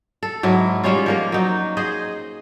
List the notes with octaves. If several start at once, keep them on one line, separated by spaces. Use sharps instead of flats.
A4
G#2 F#3 E4
G3 G#3 C#4 F4
F3 A#3 A#4
F#3 D#4
G#4 C5 D#5